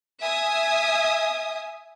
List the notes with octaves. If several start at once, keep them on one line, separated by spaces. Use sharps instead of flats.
E5 G#5 D#6